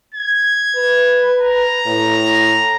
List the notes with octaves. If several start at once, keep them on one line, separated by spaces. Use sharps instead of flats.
G#6
B4
A#5
A2